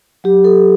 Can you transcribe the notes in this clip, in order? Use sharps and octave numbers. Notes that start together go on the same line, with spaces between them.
F#3 G4
A4